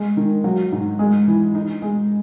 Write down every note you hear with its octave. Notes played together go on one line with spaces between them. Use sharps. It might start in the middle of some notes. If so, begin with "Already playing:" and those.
Already playing: G#3
D#3
F#3
G#2
G#3
E3
D#4
G#3